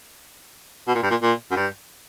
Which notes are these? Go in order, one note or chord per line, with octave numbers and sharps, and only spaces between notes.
B2
A#2
G2
A#2
A#2
F#2
G2